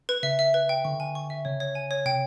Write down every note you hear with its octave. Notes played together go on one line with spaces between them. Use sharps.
B4
C#3 E5
E5
B4
G5
D3 C#6
G#5
C#6
E5
C#3 C#5
C#5
G#5
C#5
C3 G5